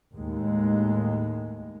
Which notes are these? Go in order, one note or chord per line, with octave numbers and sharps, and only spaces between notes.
D#2 A2 G#3